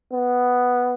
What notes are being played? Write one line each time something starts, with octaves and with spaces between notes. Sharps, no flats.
B3